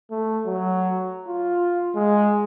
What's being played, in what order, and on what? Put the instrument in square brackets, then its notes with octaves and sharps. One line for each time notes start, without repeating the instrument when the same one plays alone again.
[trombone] A3
F#3
F4
G#3